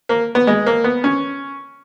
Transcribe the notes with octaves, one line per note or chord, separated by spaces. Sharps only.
A#3
B3
G#3
A#3
B3
C#4